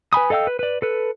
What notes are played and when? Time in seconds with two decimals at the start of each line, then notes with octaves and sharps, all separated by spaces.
0.13 B4 G#5 B5 D#6
0.30 A4 D#5 F5 G5 E6
0.47 B4
0.59 B4 D5
0.82 A4 B4